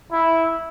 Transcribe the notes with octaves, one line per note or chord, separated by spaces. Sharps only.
E4